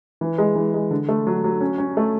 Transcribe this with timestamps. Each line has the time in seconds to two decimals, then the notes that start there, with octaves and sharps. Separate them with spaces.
0.21 E3
0.38 G#3
0.55 E3
0.74 G#3
0.91 D3
1.09 A3
1.27 F#3
1.44 F#3
1.61 C#4
1.78 C#4
1.97 A3